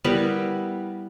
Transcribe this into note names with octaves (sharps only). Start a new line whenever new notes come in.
G3 B3 E4 A#4